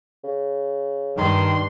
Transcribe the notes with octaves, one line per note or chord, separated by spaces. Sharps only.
C#3
G2 D#3 C6